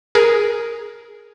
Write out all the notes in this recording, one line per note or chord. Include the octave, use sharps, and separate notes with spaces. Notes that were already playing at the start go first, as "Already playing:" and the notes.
G#4 A#4